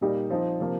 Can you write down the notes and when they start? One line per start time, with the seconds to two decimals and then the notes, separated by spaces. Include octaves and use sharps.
0.01 A#2 G3 A#3 D#4 G4
0.30 F3 C4 D#4
0.60 C3 F3 A#3